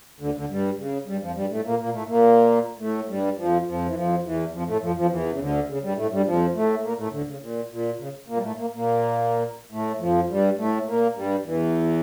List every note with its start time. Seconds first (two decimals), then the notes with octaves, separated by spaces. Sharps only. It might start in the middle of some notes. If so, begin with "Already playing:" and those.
0.20 D2 D3
0.35 D2 D3
0.50 G2 G3
0.78 C#3
1.07 G2 G3
1.22 F2 F3
1.36 G2 G3
1.50 A2 A3
1.65 A#2 A#3
1.80 A#2 A#3
1.93 A2 A3
2.08 A#2 A#3
2.80 A2 A3
3.09 G2 G3
3.37 F2 F3
3.67 F2 F3
3.86 E3
3.95 F2 F3
4.24 E2 E3
4.53 F2 F3
4.67 A2 A3
4.82 F2 F3
4.96 F2 F3
5.10 E2 E3
5.31 C#3
5.39 D2 D3
5.69 C#3
5.83 G2 G3
5.97 A2 A3
6.11 G2 G3
6.26 F2 F3
6.55 A2 A3
6.83 A#2 A#3
6.97 A2 A3
7.12 D2 D3
7.27 C#3
7.41 A#2
7.70 A#2
7.99 C#3
8.28 A#2 A#3
8.36 G3
8.42 A2 A3
8.57 A#3
8.75 A#2 A#3
9.72 A2 A3
10.00 F2 F3
10.29 G2 G3
10.58 A2 A3
10.87 A#2 A#3
11.15 G2 G3
11.44 E2 E3